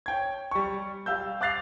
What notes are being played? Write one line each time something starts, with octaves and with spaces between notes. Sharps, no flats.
C#5 G5 G#6
G3 C#6
G3 F5 E6 G6
F5 D6 F#6 A6 C7 F7